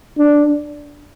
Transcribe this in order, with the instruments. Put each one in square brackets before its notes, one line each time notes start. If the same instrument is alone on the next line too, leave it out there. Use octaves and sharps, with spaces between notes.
[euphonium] D4